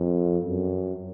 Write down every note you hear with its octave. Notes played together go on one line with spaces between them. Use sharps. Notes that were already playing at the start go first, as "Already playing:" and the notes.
Already playing: F2
F#2